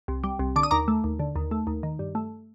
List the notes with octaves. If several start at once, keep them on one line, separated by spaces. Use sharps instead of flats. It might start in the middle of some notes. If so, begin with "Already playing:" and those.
C2
G3
C2
D3 D6
D#6
D#2 A#5 D6
A3
D#2
D3
D#2
A3
D#2
D#3
G2
A3